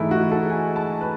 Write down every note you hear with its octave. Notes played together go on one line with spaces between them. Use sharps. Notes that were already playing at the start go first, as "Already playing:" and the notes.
Already playing: G#2 E3 A3 D#4 E4
F#4
A4
G#5
A5
B4